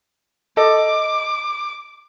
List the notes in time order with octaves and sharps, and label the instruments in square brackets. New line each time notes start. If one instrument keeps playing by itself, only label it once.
[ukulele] A4 D#5 [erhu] D6